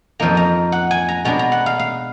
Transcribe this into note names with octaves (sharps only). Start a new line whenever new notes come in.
F2 F3 A#3 D#4 A#5
A#5
F#5
G#5
A#5
B2 G#3 B3 D4 A#5
A#5
F#5
F5
F5